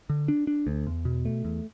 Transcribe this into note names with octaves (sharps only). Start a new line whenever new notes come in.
D3
D4
D4
D2
E2
B2
A3
E2